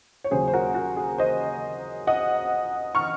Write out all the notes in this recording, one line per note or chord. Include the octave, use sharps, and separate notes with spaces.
C#5
D#2 C#3 F#3 G#4 C5
C5
F#4 A#4
F#4
G#4
C5 D#5
D#5 F#5
C#6 F6